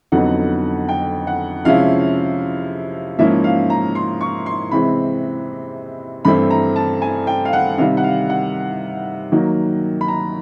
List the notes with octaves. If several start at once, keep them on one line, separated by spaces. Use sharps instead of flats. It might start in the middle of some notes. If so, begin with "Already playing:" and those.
F2 D3 F#3 B3 D#4 F#5
G5
F#5
C3 F3 G#3 C#4 E4 F5
G#2 F3 A#3 C#4 E4 E5
F5
A#5
C6
C#6
C6
C3 E3 G#3 C4 B5
G2 E3 A3 C4 E4 B5
A#5
A5
G#5
G5
F5
F#5
C3 D#3 G3 F5
F#5
F5
F#5
D#3 F#3 A#3
B5
A#5